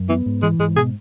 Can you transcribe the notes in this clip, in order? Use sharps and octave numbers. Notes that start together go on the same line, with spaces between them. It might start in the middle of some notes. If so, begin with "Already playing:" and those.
Already playing: F#2
E3 B3
G#2
E3 G#3
G#2 G#3
B2 G#4